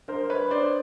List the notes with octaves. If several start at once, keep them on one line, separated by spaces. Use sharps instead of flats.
D4 A#4 C5
B4 C#5
D4 C5 D5